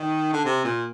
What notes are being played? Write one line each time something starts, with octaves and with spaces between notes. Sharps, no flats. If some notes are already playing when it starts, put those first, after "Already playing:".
Already playing: D#3
D3
C3
A#2